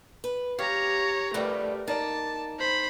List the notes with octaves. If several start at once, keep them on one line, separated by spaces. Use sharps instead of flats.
B4
G4 C#5 F5 A#5
F2 D3 G3 A3 G4 A#4 B4
A#3 D#4 D5 A5 A#5
C5 B5